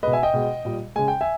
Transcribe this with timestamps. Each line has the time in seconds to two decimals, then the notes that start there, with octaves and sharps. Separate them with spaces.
0.03 G#3 B4 D#5
0.07 B2
0.13 E5 G#5
0.23 D#5 G5
0.34 B2 G#3
0.65 A#2 G3
0.96 C#3 G#3 G#5
1.08 G5
1.21 E5 G#5